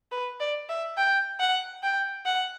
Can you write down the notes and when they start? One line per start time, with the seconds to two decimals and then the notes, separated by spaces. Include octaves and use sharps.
0.12 B4
0.40 D5
0.69 E5
0.98 G5
1.40 F#5
1.83 G5
2.26 F#5